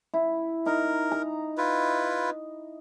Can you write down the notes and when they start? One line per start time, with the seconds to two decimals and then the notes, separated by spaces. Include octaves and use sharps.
0.14 E4
0.66 D#4 A#4
1.12 A#5
1.57 E4 F4 B4